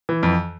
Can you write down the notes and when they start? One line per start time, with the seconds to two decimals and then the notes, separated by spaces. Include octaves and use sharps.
0.09 E3
0.23 F2